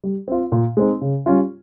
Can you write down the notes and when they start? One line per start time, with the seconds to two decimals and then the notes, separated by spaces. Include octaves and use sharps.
0.04 G3
0.28 C4 F4
0.52 A#2
0.77 G#3 C4 D#4
1.01 C#3
1.26 G3 C#4 F4